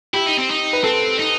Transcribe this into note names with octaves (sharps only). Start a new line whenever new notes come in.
E4 G4
D#4
C4
D#4
B4
C4 A4
D#4